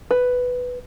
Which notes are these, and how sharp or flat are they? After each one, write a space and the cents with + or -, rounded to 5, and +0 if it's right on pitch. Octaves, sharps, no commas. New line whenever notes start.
B4 +5